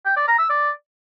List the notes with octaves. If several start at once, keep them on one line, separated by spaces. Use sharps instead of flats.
G5
D5
A#5
E6
D5